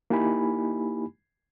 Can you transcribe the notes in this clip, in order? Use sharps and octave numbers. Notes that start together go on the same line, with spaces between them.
A#3 D#4 E4 G4 G#5 B5